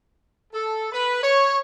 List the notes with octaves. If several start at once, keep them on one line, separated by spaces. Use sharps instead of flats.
A4
B4
C#5